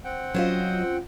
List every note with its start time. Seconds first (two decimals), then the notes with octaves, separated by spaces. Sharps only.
0.05 C4 F#5 G5
0.35 F#3 C#4 F4 C5 D#5